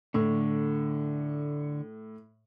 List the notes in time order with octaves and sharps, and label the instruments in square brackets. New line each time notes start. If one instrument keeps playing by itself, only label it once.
[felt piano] A2 [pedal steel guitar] D3 C#6